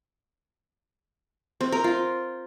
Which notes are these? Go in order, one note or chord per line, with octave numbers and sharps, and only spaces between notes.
C4
A#4
F4